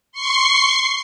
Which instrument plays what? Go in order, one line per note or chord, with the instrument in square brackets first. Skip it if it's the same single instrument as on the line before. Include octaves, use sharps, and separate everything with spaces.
[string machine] C6 C#6 C7